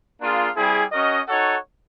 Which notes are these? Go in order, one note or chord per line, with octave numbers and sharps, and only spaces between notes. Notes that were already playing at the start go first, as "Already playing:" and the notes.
A#3 D4 F4 G#4
G3 C4 E4 G#4
C#4 F#4 A#4 D#5
D#4 F#4 A4 C#5 F#5